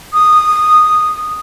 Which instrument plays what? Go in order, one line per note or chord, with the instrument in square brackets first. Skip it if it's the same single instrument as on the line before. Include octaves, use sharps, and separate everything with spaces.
[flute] D#6